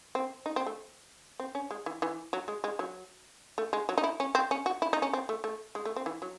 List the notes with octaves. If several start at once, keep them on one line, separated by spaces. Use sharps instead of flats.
C4
D#4
C4
A3
C4
C#4
G#3
E3
E3
F#3
G#3
G#3
F#3
A3
G#3
F#3
D#4
E4
C#4
C4
C#4
F#4
E4
D#4
C#4
C4
A3
A3
G#3
A3
C4
E3
F#3